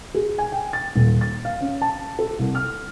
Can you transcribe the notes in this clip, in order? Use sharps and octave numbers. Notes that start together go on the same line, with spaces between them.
G#4
G#5
G5
A6
D#1
A6
F5
C#4
A5
A4
C2
F6